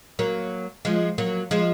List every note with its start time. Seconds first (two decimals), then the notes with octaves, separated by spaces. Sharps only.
0.19 F#3 A#3
0.85 F3 G#3
1.18 F#3 A#3
1.51 F3 G#3